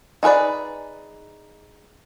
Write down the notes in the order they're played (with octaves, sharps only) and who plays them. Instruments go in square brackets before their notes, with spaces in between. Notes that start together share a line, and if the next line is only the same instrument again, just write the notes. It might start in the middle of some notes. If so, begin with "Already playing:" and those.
[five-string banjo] D#4 G#4 A#4 B4 D5